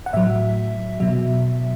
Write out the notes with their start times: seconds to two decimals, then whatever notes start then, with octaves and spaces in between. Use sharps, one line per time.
0.06 F#5
0.13 A2 F#3 E5
1.00 B2 F#3 E5